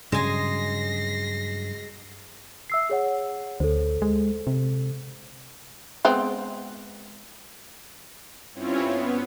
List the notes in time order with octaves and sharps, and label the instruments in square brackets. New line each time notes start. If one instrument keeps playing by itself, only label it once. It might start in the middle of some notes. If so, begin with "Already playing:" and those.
[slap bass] G2 F#3 [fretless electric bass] C#3 [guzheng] G#3 G#5 [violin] A#6 C7
[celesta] E5 E6 C7
G#4 C#5 F#5
[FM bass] D2 [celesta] A4 C5
[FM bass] G#3
C3
[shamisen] G#3 B3 C4
[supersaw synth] G2 C4 C#4 E4 F4 C#5
B3